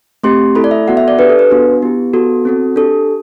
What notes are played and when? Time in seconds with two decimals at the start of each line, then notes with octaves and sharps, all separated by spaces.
0.23 A3 C4 G4 C6
0.55 A3 E4 A4 B5
0.64 D5
0.71 E5
0.87 B3 F#4 A4 F#5
0.97 E5
1.08 D5
1.19 D4 G4 B4
1.29 A4
1.39 B4
1.50 B3 D4 F#4
1.82 B3 E4 G4
2.13 B3 F#4 A4
2.45 C4 F#4 A4
2.76 D4 G4 A4